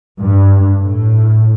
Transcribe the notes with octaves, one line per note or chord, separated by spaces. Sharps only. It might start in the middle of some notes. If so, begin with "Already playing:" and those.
G2
A2